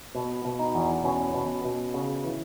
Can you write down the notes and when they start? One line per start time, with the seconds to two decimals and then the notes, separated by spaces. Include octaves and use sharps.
0.15 B2
0.45 B2
0.59 D#4
0.75 E2
1.04 B2 C#4
1.34 B2
1.65 B2
1.94 C#3
2.25 E3